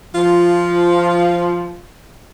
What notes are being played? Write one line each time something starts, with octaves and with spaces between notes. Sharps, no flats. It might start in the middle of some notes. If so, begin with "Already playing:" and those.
F3 F4